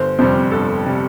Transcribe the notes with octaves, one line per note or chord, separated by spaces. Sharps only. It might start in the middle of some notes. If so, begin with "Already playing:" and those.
Already playing: G1 C5
F2 C3 G3 C5
G1 A4
C3 G3